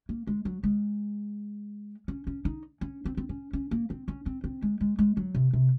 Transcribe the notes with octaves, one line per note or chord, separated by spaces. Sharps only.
A#3
G#3
F#3
G#3
C#4
C#4
D#4
C#4
C4
C4
C#4
C#4
A#3
C4
C#4
C4
C4
G#3
G#3
G#3
F#3
C3
C3